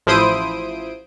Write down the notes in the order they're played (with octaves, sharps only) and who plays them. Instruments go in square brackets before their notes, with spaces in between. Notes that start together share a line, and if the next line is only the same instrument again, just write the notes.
[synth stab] A1 F3 E4 C5 D#6 D7